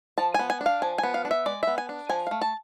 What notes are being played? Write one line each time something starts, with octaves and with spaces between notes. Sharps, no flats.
F3 A5
B3 G#5
G#5
D4
F5
F3 G#5
G#5
B3
F5
D4
E5
G#3 D5
B3 E5
G#5
D4
F3 G#5
A3 F5
A5